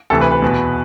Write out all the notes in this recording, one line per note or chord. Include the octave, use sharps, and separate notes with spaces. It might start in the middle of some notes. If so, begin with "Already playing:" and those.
D2 C3 E3 A4
B4
B4
E2 B2